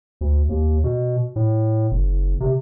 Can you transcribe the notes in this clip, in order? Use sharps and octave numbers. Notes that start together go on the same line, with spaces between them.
D2
D#2
B2
A2
F#1
C3